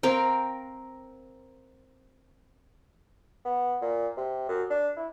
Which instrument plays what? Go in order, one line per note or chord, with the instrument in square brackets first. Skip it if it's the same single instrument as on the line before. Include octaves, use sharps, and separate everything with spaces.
[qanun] C4 A#4 F5 G5
[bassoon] B3
A#2
C3
F#2
D4
E4